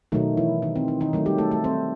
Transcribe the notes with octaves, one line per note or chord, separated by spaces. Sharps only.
B2 D#3 F#3 A3 D#4
E3 E4
D#3 D#4
C4
C4
D#3 D#4
D#3 F#3 A3
G3 G4
A3 A4
A3 A4
C4 C5